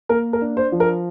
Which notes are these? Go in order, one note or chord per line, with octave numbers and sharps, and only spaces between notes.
A#3 A#4
A#4
D4
C5
F3
A#4